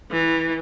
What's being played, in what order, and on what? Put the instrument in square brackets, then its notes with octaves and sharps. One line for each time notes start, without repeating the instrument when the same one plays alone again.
[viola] E3